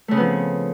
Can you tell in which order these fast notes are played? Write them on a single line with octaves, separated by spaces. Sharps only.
A3 C#3 C4 B3 F3